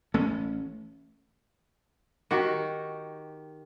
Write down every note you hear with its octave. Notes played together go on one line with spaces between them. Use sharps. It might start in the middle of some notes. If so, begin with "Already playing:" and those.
A1 A3 C#4
D#3 F#4 G4